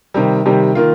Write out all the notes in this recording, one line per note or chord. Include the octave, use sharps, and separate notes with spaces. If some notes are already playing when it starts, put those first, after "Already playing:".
C3 D#3 G3
C3 D#3 G3
D#3 A#3 F4